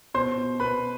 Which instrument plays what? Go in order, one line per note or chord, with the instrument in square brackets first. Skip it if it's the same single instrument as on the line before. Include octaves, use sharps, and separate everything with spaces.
[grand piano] B2 C5 C6
B2
B2 B4 B5